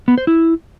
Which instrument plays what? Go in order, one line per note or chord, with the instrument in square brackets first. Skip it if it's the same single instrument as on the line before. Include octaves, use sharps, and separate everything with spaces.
[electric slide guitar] B3
C5
E4